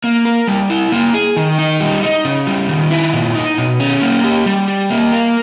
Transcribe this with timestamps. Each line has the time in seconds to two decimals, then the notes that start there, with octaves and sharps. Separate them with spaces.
0.04 A#3
0.25 A#4
0.47 G3
0.70 E4
0.92 A#3
1.14 G#4
1.37 D#3
1.58 D#4
1.81 G3
2.03 D#4
2.25 C#3
2.47 G3
2.69 D#3
2.91 E4
3.13 A#2
3.35 D#4
3.58 B2
3.80 C#4
4.02 A#3
4.24 G4
4.46 G3
4.68 G4
4.90 A#3
5.12 A#4